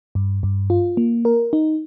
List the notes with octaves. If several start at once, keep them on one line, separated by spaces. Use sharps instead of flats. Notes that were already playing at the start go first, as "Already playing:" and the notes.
G2
G2
F4
A#3
A#4
D#4